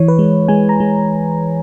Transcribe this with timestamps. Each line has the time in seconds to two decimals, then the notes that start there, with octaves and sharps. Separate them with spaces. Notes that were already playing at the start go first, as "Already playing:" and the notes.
Already playing: E3 C#5
0.08 B4
0.19 G#3
0.48 G#3 G#5
0.69 A#5
0.80 G#3